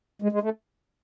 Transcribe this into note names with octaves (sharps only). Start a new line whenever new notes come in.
G#3
G#3
A3